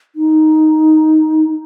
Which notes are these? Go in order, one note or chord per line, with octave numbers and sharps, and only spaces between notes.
D#4